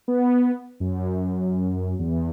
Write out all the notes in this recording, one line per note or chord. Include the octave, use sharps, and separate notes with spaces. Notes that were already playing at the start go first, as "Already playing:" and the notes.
B3
F#2
E2